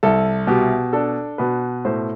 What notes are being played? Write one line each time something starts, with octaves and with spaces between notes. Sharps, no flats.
C2 A4
B2 G4
D4 A4
B2 B4
A2 C5